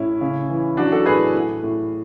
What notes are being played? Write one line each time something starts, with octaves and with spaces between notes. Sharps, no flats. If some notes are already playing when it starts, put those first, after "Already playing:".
Already playing: A2 C#4 E4
C#3
E3
F#3 D4 F#4
F#4 A4
A2 G#4 B4
A2
A2